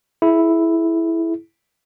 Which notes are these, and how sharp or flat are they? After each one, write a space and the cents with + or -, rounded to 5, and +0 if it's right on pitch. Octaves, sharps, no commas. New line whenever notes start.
E4 +0 G#4 +30